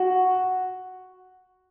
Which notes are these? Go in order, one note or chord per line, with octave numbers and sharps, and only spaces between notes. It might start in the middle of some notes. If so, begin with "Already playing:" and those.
Already playing: F#4